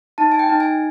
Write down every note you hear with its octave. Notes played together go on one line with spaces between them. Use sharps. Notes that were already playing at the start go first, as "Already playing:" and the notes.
D#4 A5
G#5
G5
D#4
G#5